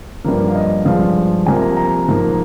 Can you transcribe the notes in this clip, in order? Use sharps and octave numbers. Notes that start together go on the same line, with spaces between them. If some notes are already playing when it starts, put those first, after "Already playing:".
G2 F3 A#3
F5
D#5
G2 F3 G#3 F5
C2 C3 F3 A#3 G#5
A#5
A#5
G#2 F3 A#3